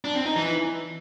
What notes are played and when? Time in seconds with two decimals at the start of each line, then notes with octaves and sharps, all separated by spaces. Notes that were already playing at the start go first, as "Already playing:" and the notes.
0.05 D4
0.15 C4
0.26 D#4
0.36 E3